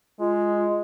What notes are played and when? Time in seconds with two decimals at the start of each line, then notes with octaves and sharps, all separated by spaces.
0.20 G#3 F4